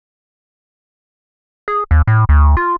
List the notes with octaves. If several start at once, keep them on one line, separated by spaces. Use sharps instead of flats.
G#4
D#2
A2
D2
F4